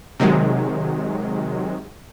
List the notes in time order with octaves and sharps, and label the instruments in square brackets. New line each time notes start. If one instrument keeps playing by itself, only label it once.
[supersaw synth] C3 D#3 F#3 G#3